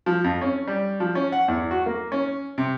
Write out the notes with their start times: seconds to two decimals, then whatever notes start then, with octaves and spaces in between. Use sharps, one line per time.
0.06 F3
0.24 F2
0.41 C#4
0.68 G3
1.00 F3
1.15 C#4
1.32 F#5
1.48 E2
1.71 F#4
1.86 A#3
2.12 C#4
2.58 C3